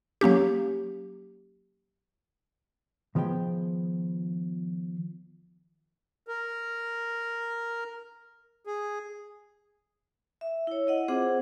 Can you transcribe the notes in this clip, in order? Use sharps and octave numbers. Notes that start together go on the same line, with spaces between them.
F#3 A#3 C#4 G4
D#3 F3 B3 G#4 G5
A#4
G#4
E5
E4 C#5
E4 D#5 F#5
C4 F4 G#4 C5 F#5 D6